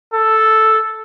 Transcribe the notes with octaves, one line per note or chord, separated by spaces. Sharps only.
A4